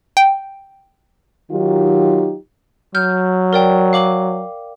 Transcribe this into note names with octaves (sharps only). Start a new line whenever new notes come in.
G5
D#3 F#3 D#4 F4 G4
F#3 F6 G6
A#4 D5 G5
F5 D6 F#7